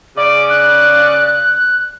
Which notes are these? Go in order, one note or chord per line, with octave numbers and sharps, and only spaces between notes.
C#3 D5 D6
F#6
F#6